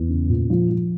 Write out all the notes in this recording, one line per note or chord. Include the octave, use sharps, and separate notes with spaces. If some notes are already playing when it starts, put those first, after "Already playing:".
Already playing: E2
C#3
A#2
F3
F3